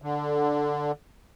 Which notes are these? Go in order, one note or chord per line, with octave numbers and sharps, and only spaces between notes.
D3